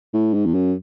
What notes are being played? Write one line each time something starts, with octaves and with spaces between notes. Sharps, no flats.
A2
G#2
E2
F#2